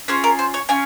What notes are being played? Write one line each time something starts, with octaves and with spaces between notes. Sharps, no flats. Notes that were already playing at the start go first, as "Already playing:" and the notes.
C#4 F4 G#4 C5
A#4
C5
C#5
C#4 F4 G#5